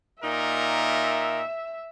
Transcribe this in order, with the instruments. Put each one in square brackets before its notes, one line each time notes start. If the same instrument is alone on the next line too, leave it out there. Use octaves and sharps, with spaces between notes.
[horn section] A#2 D#4 A#4 [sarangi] E5